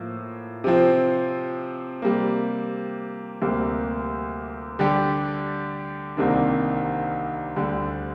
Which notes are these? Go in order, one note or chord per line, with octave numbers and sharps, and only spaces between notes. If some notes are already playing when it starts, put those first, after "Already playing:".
Already playing: A2 F3 A#3 F4
C3 F3 C4
C3 G3 A#3
D2 C3 G3 A#3
D3 G3 D4 G4
C2 C3 D#3 A#3 D4
D2 D3 G3